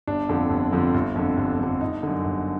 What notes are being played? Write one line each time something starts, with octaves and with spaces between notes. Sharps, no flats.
G1 D4
F2 D3 F3
G1
F2 D3 F3
G1
F2 D3
G1
F2 D3
G1 D#4
F#2 D3
G1